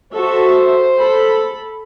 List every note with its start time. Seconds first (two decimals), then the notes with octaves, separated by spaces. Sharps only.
0.13 F#4 A4 C5 E5
0.98 A4 B5